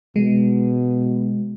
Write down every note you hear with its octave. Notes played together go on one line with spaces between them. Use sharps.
B2 G#3